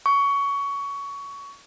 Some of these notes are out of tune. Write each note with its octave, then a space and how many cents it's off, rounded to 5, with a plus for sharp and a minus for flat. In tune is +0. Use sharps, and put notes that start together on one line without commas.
C#6 +20